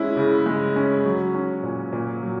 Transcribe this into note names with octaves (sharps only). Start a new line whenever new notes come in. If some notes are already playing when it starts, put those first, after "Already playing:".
Already playing: G#3 C#4 E4
C#3
G#3
C#4
F#3
C#4
A#2
A#2
F#3